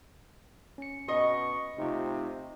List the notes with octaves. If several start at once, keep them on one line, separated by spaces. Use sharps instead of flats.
C#4 C#7
B2 D#5 C#6
C3 A3 D#4 F4